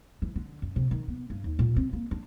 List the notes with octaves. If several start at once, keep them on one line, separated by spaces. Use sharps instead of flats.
E3
D3
F#2
C3
D#3
B3
G2
D#2
A#2
C4
A#3
D4